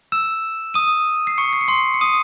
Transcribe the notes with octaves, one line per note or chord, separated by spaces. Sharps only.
E6 E7
D#6 D#7
C7
C#6 C#7
C7
C#7
C6 C7
C#7
D#6 D#7